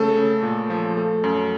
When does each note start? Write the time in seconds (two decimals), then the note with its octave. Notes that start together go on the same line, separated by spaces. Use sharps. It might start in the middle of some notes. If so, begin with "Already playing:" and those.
Already playing: C#3 A3 A4
0.17 C#3
0.42 A#2
0.70 F3
0.97 A3
1.24 F#2